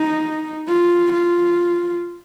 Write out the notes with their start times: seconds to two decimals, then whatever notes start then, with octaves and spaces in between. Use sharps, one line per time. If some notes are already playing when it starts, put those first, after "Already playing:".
Already playing: D#4
0.67 F4
1.13 F4